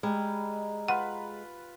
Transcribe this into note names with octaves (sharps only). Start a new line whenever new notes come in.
G3 G#3 D#5 A#5
F4 B4 F#5